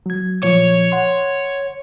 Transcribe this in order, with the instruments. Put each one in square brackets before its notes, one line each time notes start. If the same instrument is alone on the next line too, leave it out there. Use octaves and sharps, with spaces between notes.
[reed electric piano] F#3 G#6
[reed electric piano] A#2 F3 [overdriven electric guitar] C#5
[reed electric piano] F#5 C6